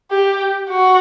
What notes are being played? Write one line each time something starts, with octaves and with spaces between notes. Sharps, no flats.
G4
F#4